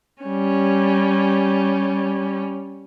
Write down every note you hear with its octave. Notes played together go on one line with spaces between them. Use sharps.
G3 C#4